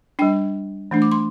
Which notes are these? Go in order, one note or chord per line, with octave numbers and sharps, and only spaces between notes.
G3 D4 G5
E3 A3 D4
D6
C6